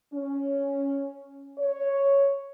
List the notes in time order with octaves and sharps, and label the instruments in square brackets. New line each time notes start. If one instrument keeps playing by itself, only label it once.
[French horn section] C#4
C#5